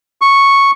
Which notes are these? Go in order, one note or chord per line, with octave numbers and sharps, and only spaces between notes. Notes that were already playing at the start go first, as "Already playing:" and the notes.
C#6